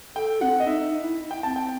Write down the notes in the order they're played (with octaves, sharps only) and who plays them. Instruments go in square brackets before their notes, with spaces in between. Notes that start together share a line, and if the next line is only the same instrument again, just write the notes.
[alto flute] A4 [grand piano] G5
[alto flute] C4 [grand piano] F#5
[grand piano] D#5
[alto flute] D#4 [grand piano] E5
[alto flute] D#4
E4
[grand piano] G5
[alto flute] C4 [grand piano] A5
[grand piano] G5